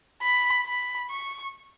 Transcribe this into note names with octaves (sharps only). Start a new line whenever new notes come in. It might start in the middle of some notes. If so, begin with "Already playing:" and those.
B5
B5
C#6